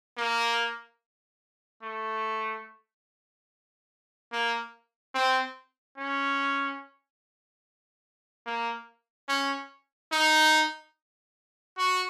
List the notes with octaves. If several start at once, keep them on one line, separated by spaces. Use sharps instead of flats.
A#3
A3
A#3
C4
C#4
A#3
C#4
D#4
F#4